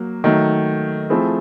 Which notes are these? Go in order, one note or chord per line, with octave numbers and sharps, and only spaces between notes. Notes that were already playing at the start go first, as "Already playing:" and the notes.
Already playing: F#3 A#3
D#3 F#3 A3
F3 A3 C4 E4 G#4